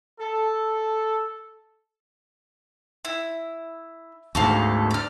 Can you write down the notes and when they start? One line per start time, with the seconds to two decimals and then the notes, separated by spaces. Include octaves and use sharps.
0.20 A4
3.05 E4
4.35 D2 G#2 F#4 A4 F5
4.91 D5 F6